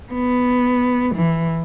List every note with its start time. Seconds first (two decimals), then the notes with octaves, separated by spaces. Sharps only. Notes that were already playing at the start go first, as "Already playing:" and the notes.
0.13 B3
1.15 E3